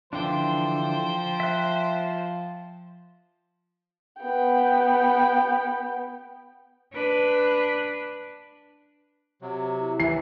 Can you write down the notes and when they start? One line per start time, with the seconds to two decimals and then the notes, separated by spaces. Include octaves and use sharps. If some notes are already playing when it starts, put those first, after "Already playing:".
0.13 D3 E3 F3 D4 C5 G5
1.40 E5 F#6
4.21 B3 G5
6.93 D4 B4
9.42 C3 F#3
9.79 E4
10.00 E3 C7